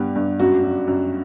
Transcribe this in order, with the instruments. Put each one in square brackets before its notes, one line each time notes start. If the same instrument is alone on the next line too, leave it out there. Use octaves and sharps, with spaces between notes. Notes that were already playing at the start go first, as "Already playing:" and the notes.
Already playing: [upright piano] G2 B3 [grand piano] G4
[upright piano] G2
[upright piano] F#2 [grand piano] F#4
[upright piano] F#2
F#2